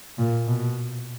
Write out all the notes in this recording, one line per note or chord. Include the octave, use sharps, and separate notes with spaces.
A#2
B2